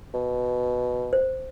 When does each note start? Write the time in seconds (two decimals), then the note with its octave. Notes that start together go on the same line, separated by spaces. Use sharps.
0.14 B2
1.13 C5